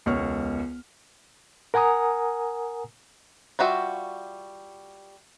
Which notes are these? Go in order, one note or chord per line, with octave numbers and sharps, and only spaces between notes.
E1 C#2 C#5 C#6 F6 C#7
A#4 F#5 G#5 A#5 D#6
G3 F4 F#4 E5